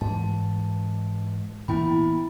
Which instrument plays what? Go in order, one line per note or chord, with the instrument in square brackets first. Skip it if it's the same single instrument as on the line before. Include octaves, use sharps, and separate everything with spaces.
[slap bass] G#2 E3 [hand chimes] A5
[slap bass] A#2 E3 B3 [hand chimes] E4 G5 B5